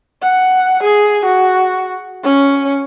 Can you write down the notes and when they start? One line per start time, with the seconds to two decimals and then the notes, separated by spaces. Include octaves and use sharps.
0.22 F#5
0.83 G#4
1.25 F#4
2.23 C#4